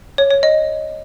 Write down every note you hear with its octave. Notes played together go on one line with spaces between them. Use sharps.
C#5
C#5
D#5